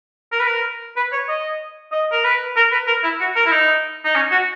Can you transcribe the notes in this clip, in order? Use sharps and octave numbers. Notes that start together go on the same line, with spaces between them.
A#4
B4
A#4
B4
C#5
D#5
D#5
A#4
B4
A#4
B4
A#4
E4
F#4
A#4
E4
D#4
D#4
C#4
F#4